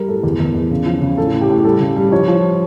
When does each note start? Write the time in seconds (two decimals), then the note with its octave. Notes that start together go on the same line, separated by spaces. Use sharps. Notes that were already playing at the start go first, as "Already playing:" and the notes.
Already playing: G3 A#4
0.08 A2 A4
0.23 E2
0.40 E2
0.55 E2
0.71 C#3
0.86 F3
1.01 C#3
1.17 A2 A4
1.34 A2
1.41 G4
1.50 A2
1.58 G4
1.64 G3 A4
1.80 C#3
1.96 G3
2.12 F3 C#5
2.28 F3